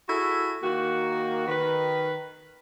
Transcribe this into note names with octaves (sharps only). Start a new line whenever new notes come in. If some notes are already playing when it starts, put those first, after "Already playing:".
E4 F#4 G#4 A4
D#3 A#3 F#4
D#3 B4